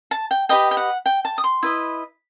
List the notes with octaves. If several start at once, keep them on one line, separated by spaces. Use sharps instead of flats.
A5
G5
G4 B4 D#5 G5
G5
F#5
G5
A5
D#6
C6
E4 B4 D#5